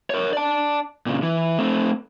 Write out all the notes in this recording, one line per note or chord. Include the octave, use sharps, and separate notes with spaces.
A#4 C#5
D5 A5
A#2 C#3
E3
A3 C4